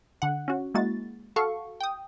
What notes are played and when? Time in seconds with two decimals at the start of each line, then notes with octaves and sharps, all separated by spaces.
0.22 D3 F#5
0.48 C#4 F#4
0.74 G#3 A#3 E4 F#4 A6
1.36 F#4 A4 F5 C#6
1.80 G5 D#6